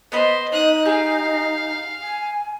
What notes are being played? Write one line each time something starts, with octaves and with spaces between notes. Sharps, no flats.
B3 C5 D#5 B5
D#4 D#6 F#6
G4 G#4 F5
G#5